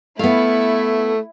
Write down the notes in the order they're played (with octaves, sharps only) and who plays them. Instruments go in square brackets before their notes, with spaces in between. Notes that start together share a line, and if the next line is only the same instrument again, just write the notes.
[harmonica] A3 [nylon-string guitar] B3 F5 [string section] E4